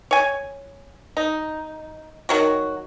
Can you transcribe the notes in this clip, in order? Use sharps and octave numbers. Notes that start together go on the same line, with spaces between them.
C#5 G#5
D#4
D#3 F#3 F#4